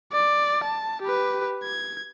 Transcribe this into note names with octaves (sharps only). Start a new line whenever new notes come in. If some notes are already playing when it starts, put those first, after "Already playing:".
D5
A5
G4 B4
G#6